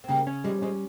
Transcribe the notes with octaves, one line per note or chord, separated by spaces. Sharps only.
C4
C#3 G3 A#3
C#4
F3 G3 G#3
F3 G#3 C#4